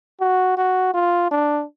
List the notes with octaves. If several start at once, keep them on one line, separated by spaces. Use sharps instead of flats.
F#4
F#4
F4
D4